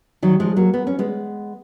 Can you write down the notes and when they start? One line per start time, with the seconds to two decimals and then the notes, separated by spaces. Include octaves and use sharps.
0.23 D#3 F#3
0.40 F3 G#3
0.56 F#3 A#3
0.74 B3
0.87 C#4
0.99 G#3 B3